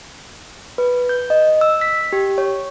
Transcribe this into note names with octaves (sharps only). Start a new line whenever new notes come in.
B4
G6
D#5
E6
B6
G4
C#5